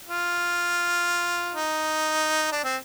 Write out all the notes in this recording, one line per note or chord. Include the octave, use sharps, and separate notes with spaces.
F4
D#4
D4
C4